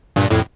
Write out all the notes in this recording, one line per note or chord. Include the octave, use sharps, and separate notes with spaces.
G2 A#2
F2 A2